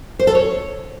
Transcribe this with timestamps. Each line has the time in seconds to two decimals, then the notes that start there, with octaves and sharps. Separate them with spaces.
0.19 C5
0.27 A4
0.35 C#5